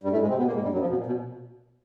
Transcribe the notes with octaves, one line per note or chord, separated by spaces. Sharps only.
G2 G3
A2 A3
G#2 G#3
C3 C4
B2 B3
A#2 A#3
G#2 G#3
G2 G3
F#2 F#3
F2 F3
B2
A#2
B2